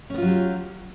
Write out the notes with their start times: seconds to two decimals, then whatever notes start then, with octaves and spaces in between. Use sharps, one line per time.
0.10 C#4
0.14 B3
0.18 F4
0.22 F#3
0.26 G4